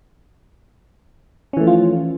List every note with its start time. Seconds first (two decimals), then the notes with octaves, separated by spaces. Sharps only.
1.53 C#4
1.57 E3
1.60 A3
1.64 F3
1.67 F4